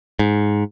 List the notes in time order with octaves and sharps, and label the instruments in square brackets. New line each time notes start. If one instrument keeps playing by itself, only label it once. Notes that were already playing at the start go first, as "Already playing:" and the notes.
[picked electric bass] G#2